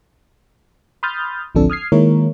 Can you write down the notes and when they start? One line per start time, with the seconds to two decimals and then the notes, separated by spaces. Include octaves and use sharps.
1.03 B5 C6 D#6 F6 G6 A6
1.55 A1 D2 F3 C4 D4 A4
1.70 D#6 F6 G#6 C7
1.92 D#3 G#3 A#3 E4 A#4 C#5